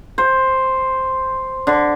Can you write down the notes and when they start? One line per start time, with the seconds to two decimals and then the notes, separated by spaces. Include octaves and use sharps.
0.18 C5
1.67 D3